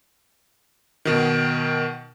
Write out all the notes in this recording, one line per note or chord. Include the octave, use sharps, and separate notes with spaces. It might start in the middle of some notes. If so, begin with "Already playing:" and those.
B2 D#3